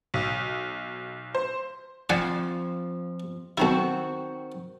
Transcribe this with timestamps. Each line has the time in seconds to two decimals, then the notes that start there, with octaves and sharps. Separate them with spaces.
0.14 B1
1.35 C5
2.10 F2 F3 D5 F#5 G#5
3.58 B1 D#3 C4 E4 F#4